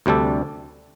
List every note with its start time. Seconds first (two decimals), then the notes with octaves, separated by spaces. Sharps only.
0.06 D2 C3 G3 D4 A4